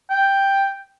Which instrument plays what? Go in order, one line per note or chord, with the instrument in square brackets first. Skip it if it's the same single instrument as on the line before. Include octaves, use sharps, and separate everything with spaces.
[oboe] G5